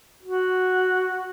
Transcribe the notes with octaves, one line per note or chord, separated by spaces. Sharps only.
F#4